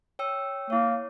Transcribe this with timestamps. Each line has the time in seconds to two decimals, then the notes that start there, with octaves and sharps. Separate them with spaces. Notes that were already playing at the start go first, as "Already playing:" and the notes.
0.19 C#5 G5 E6
0.70 A#3 E4 C#5